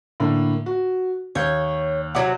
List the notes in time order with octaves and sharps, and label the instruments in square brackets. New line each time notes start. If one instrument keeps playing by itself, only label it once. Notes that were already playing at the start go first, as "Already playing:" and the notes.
[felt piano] A2 D3 A#3
F#4
[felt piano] D#2 G6 [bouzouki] C#5
[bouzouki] C3 F#3 [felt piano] F#5 D6